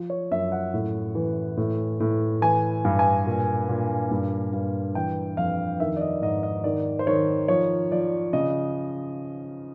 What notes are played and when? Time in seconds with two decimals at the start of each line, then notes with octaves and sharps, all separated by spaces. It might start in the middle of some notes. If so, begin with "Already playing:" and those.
Already playing: F3
0.10 C#5
0.31 F#2 E5
0.52 F#5
0.74 A2
1.15 E3
1.57 A2
2.00 A2
2.42 E3 G#5
2.85 G2
2.99 G#5
3.26 A#2
3.69 A#2
4.11 G2
4.53 G2
4.95 E3 G5
5.37 F2 F5
5.80 D#3 E5
5.97 D5
6.01 D#5
6.22 G#2 D#5
6.43 D#5
6.64 D#3 D5
6.99 C5
7.07 D#3 C#5
7.48 F3 C#5
7.91 F3 D5
8.33 C#3 D#5